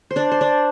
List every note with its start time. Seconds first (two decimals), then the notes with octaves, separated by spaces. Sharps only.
0.11 C5
0.16 D4 D5
0.31 C5
0.41 D4 D5